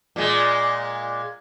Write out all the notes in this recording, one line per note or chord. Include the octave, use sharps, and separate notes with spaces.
A#2 G#3